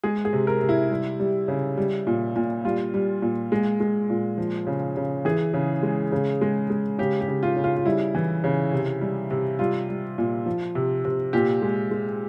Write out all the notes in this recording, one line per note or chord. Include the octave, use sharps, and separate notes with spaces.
G#3 G#4
G#4
C3
A#4
C3
E4
G3
G3
C#3
G3
A#2
A#2
G3 F4
G3
A#2
G#3
G#3
A#2
F3
C#3
C#3
E3 G#4
C#3
G#3
C#3
G#3
G#3
C#3 G4
G4
C#3
F4
C#3
F4
F4
G3 E4
E3
C#3
C3
G3
C3
G3 F4
G3
A#2
F3
C3
C3
A#2 G4
G#3
G#3